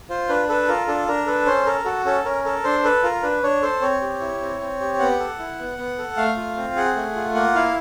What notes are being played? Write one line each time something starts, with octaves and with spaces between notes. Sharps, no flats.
F4 C5
D4 B4
A4 B4
F4 A#4
D4 A4
D4 A#4
A4 B4
C#4 C5
A4 A#4
F#4 A4
C#4 A4
C#4 A#4
A4 A#4
D4 C5
A4 B4
F4 A#4
D4 B4
D4 C#5
A4 C5
C4 C#5
G4
E4
C4
C4
G4
B3 F#5
A4
E4
B3
B3
A4
A3 F5
F4
C4
G#4 F#5
A3
F4
A#3 F#5
E4 F5